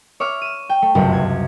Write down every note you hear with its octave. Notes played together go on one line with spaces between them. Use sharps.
C#5 E5 D6 F6
D#7 E7
G5
A3
G1 C#2 F#2 C3
G#6